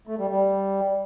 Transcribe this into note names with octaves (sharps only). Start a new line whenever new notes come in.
A3
G3
G3